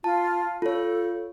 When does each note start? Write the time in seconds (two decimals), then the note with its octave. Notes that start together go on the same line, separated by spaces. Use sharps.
0.04 F4 A5
0.62 F4 A4 C#5